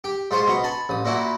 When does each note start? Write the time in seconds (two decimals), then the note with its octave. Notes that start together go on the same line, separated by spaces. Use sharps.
0.04 G4
0.31 G#2 F4 C5 C6 C#6
0.47 B2 D#5 C#6
0.64 G#5 A5 B5
0.89 A1 D#6
1.05 A#2 A#3 E4 F#4